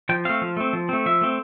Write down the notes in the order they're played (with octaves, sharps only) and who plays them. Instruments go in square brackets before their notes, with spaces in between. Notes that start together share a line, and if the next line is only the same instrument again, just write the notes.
[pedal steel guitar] F3 G5
A3 C4 F5
F3
A3 C4
F3
A3 C4
F3 E5
A3 C4